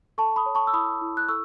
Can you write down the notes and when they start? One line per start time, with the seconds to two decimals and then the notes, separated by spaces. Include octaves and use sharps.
0.18 A4 A5 C#6
0.36 B5 D#6
0.46 C#5
0.55 A5 C#6
0.67 E6
0.73 E4 B5 D#6
1.01 E4
1.17 F#6
1.29 A4 C#6 E6